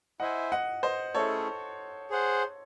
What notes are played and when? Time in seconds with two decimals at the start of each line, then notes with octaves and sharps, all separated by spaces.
0.20 E4 C5 D#5 E5 F#5 G#5
0.52 D#5 F#5
0.83 C5 D#5
1.15 A3 C#4 E4 G#4 A4 C#5
2.10 G#4 C5 F#5